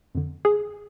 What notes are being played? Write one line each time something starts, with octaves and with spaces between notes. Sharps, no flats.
F2 D3
G#4